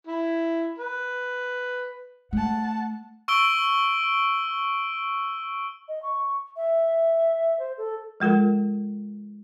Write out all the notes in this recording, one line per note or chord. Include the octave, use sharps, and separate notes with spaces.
E4
B4
A3 F#5 A5
C#6 E6 D7 G7
D#5
C#6
E5
C5
A4
F3 G#3 F4 A4 A#4